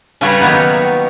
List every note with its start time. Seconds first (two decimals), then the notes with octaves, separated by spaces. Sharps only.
0.21 C#3 G3 F4 F#4 B4 C#5
0.41 D#3 F#3 A#3 B3 D#4